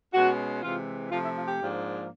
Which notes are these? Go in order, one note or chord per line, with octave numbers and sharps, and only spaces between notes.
B2 G#3 C#4 F#4
C3 E3 G#3 C4 F4
C3 F3 A3 F4
E4
F4
G4
G#2 F3 A#3 D4